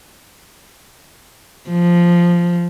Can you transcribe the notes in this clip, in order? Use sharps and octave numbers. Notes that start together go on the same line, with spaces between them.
F3